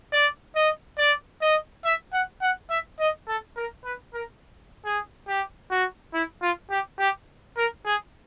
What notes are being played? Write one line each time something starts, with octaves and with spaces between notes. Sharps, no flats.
D5
D#5
D5
D#5
E5
F#5
F#5
E5
D#5
A4
A#4
B4
A#4
G#4
G4
F#4
E4
F4
G4
G4
A#4
G#4